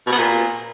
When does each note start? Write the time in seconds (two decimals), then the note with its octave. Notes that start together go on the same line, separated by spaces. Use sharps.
0.07 B2
0.12 B3
0.18 A#2